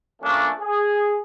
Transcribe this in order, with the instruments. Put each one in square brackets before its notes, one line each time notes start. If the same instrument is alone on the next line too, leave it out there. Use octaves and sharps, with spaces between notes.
[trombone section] F3 A3 A#3 C#4 D4
G#4